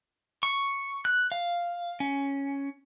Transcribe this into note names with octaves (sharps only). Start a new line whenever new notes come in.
C#6
F#6
F5
C#4